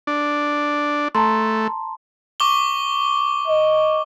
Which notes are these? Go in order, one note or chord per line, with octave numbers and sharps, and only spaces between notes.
D4
A3 A5 A#5 C6
C#6 D6 G7
D#5